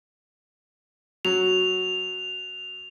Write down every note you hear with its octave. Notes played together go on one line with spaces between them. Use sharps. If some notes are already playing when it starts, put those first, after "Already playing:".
F#3 F7